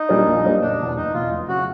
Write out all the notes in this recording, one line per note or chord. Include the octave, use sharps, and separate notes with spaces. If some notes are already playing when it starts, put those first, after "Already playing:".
Already playing: D#4
A#2 G3 A#3 D4
A#1
A#2 G3 A#3 D4
F#1 D4
E2 B2
F#1 D#4
E2 B2 F4
F1
C#3 F#3 F#4